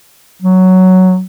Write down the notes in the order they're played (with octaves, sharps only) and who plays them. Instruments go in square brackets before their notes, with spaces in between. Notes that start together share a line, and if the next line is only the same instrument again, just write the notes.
[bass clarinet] F#3